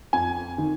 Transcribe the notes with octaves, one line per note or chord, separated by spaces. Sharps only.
F2 G#5
D#3